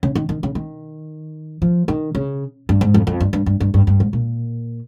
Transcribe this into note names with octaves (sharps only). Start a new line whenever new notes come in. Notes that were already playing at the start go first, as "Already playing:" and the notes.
C#3
D#3
D#3
C#3
D#3
F3
D#3
C#3
G2
G#2
F2
F2
G2
G2
G2
G2
G2
G2
G#2
A#2